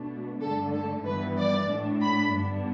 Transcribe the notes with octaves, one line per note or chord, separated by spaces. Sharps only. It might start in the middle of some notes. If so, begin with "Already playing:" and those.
Already playing: B2 A3 D4
G2 D3 A3 D4 A4
A4
G2 E3 G3 B3 B4
D5
A2 A3 D4
B5
G2 D3 B3 D4